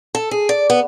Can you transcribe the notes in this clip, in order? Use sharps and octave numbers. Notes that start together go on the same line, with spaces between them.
A4
G#4
D5
B3